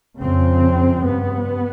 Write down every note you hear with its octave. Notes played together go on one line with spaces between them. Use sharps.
F2 C#3 C4
G2 B3